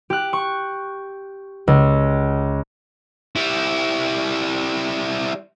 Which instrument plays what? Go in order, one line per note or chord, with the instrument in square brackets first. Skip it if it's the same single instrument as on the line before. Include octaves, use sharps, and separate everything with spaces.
[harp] G4 F#6
C#6
C#2
[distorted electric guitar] G3 E4